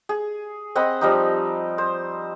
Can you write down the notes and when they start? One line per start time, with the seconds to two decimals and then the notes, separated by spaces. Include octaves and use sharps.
0.09 G#4
0.75 C4 D#5 F#5 B5
1.01 F3 G3 D#4
1.78 C5